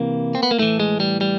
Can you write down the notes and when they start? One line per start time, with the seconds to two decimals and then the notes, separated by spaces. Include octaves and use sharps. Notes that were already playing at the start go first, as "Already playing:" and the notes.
Already playing: C3 E3 A#3
0.35 C4
0.43 B3
0.51 A#3
0.58 A2 E3 A3
0.80 G#3
1.00 G3
1.21 G3